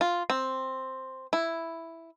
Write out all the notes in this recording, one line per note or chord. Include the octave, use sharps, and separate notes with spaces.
F4
C4
E4